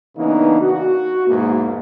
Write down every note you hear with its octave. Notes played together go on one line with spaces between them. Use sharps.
C#3 E3 A#3 B3 D4 D#4
F#4
E2 G#2 B2 A#3